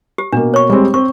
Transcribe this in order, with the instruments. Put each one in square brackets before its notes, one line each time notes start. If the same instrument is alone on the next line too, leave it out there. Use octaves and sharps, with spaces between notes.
[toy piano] G4
[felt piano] B2 A#3 [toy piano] D4
[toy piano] C#5 C#6
[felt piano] G3 G#3 C4
[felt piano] C4 [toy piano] C#6